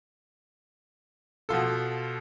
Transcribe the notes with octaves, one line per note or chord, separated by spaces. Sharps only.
B2 F3 F4 A4